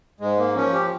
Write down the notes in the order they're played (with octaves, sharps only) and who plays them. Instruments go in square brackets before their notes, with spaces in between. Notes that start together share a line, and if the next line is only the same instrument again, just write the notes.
[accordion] G#2 G#3
A#3
F3 C#4
G4